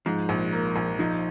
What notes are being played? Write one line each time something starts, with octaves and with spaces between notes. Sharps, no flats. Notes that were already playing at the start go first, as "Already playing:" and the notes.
G#2 F3
A#1
A#3
A#1
F3 D#4